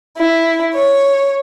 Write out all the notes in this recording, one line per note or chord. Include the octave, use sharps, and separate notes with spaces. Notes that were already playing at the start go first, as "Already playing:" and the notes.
E4
C#5